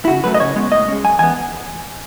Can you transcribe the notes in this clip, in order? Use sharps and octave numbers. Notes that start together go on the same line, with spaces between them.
E4
C#3 F#4
F#3 A3 B4
D#5
C#3 C#5
G#3 B3
A2 D#5
G#3 C#4
F#2 G#5
E3 B3 G#5